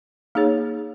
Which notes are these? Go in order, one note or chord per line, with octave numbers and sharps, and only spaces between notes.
A#3 D#4 G#4 C#5